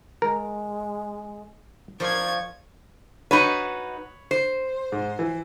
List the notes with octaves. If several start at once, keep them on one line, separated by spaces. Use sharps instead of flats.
G#3 A#4
F3 A#4 D5 C6 C#6 G#6
D#4 F#4 B4 C#5 B5
C5
G#2
E3